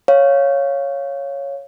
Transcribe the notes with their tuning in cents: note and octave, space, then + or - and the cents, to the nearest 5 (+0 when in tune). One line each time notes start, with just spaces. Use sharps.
C#5 +0 F5 +0